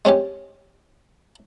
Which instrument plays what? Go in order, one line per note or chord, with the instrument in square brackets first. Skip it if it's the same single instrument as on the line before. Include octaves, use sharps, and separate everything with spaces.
[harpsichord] G#3 C4 C#4 G4